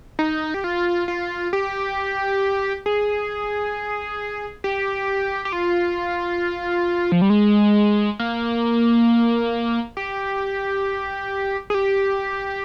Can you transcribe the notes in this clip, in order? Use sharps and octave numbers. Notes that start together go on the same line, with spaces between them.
D#4
G4
F4
F4
G4
G#4
G4
G4
F4
F3
G3
G#3
A#3
G4
G#4
G4